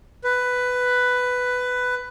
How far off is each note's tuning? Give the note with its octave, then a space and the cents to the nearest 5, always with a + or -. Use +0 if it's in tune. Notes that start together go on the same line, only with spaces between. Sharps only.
B4 +10